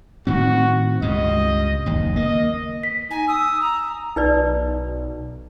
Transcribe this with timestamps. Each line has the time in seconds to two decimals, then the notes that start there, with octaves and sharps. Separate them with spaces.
0.27 A2 D#3 C4 F#4
1.02 C#2 G2 C#3 D#5
1.86 F#1 D#2
2.16 A#3 D#5
2.83 B6
3.10 D#4 G#5
3.28 D#6 E6
3.60 A#5
4.16 B1 D#4 B4 D5